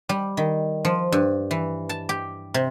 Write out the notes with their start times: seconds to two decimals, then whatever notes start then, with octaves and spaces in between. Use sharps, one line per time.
0.09 G3
0.37 D#3
0.85 F3
1.12 G2
1.51 E3
1.89 A5
2.09 G4
2.54 C3